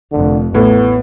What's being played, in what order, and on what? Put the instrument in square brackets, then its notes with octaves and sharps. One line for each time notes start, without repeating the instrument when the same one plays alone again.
[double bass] F1 F2 [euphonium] D3
[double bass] A1 [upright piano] A2 [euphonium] B3